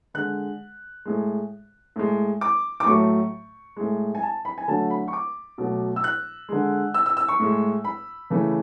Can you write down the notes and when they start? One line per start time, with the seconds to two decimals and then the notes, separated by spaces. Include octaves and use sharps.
0.14 D3 G#3 F#6
1.05 A2 G#3
1.96 A2 G#3
2.41 D6
2.80 D6
2.86 A2 F#3 A3 C#6
3.76 A2 G#3
4.15 G#5
4.23 A5
4.45 B5
4.58 G#5
4.68 D3 F#3 A3 A5
4.90 B5
5.08 C#6
5.13 D6
5.58 B2 F#3 A3
5.96 E6
6.04 F#6
6.49 D3 G#3
6.94 E6
7.06 E6
7.17 E6
7.28 C#6
7.39 A2 G#3
7.84 B5
8.30 C#3 E3 A3